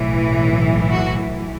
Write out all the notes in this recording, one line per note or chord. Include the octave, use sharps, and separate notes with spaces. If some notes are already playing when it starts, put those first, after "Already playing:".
Already playing: B1 A2 E3
F#4